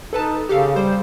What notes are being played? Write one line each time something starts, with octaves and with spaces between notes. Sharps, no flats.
D#4 A4 B4 A5
C#3 G4 A4 F5
G3 C5